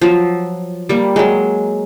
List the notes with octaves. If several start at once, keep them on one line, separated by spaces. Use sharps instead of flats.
F3 F#3
G3 A#3
F#3 G#3